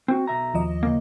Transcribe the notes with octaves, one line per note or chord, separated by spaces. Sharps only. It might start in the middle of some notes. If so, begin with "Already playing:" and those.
C4 F#4
B1 E5 A#5
D#2 F3 D#5
C#3 A#3